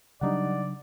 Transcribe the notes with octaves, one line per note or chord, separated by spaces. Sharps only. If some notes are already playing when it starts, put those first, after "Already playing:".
C#3 F#3 G3 D4 D#4 D5 F#5